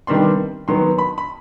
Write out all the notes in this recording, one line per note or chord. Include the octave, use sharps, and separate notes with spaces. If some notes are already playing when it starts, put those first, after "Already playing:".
C3 D#3 G3 B3 D4 C6
D#3 F#3 B3 C6
B5
B5